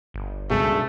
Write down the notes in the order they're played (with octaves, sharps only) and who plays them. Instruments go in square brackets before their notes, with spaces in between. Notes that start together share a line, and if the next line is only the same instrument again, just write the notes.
[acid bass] G1
[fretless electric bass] C#2 G2 B2 [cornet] A3 [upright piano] G#4